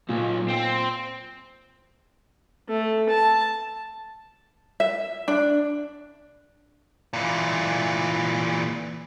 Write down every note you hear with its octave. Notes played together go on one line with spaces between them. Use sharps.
B1 A#2
C4
A3
A5
E5
D4
A#2 E3